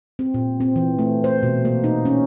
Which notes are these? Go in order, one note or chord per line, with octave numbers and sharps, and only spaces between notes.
C4
A#2
C4
E3
A3
C5
B2
A#3
D#4
C#4